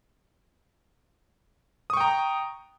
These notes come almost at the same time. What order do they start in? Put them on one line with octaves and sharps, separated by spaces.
D#6 C#6 G5 A#5